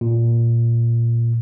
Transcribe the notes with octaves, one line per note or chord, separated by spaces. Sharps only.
A#2